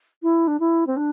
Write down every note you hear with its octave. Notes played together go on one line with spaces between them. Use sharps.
E4
D4
E4
C4
D4